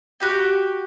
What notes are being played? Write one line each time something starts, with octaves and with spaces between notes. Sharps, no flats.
F#4 G4 G5